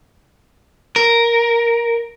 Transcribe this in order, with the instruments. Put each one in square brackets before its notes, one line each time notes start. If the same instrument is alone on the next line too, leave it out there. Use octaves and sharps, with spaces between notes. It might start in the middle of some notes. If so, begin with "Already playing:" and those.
[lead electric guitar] A#4